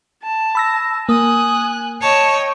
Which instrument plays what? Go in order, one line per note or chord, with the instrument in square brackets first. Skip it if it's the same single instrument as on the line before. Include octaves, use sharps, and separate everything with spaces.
[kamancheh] A5
[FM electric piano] B5 E6 A#6
[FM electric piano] A#3 [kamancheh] G#5 F#6 [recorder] D#6
[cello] C#5 [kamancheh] D#5 G5 [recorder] A5